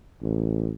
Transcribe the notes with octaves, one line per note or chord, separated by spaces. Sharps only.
A1